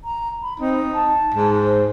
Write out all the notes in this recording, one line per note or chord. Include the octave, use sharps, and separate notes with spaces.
A#5
B5
C4 D#4
A5
G#2
C5